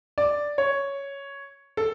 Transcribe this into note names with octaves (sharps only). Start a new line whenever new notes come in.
D5
C#5
A4